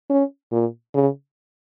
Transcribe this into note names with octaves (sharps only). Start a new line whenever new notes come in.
C#4
A#2
C#3